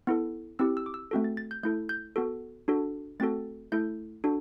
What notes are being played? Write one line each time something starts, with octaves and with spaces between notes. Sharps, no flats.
B3 E4 A4
C4 E4 G4 E6
E6
D6
E6
A3 C4 F#4 A4
A6
A6
G6
A3 E4 A4 G6
G6
B3 F#4 A4
D4 F#4 A4
A3 C4 F#4 A4 A6
A3 E4 A4 G6
D4 F#4 A4